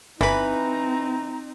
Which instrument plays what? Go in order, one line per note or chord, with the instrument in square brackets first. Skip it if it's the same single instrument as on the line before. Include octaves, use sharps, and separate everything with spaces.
[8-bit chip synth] G1 B5 [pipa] E3 B4 [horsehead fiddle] C4 D#4 [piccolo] A#5